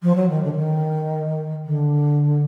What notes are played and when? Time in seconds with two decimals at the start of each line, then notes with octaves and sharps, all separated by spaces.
0.02 F3
0.15 F#3
0.29 D#3
0.43 D3
0.52 E3
0.56 D#3
1.65 D3